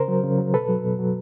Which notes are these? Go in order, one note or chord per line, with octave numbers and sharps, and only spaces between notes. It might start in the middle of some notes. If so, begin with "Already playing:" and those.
Already playing: C#3 A#4 C5
F#3
C#3
F#3
B2 A4 B4
F#3
B2
F#3